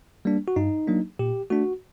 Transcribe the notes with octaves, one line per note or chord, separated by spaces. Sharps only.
G3 A#3 D4
F#4
G2 D#4
F#3 A#3 D4
A#2 G4
A3 D4 F#4